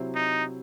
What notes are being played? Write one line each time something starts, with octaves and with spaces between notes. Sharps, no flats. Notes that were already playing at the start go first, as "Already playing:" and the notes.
Already playing: C3 F#3 C4 E4 C5
D#4